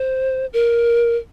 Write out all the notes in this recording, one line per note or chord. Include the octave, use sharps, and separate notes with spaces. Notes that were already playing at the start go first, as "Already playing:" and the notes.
Already playing: C5
A#4